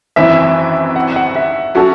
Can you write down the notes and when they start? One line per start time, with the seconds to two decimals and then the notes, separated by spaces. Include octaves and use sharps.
0.16 G#1 F#2 E3 C4 E4 E5
0.96 F#5
1.16 F#5
1.36 E5
1.75 F#3 C#4 F#4 A4